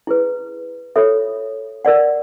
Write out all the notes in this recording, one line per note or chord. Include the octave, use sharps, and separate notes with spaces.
E4 G#4 B4
F4 A4 C#5 E5
A#4 D5 F#5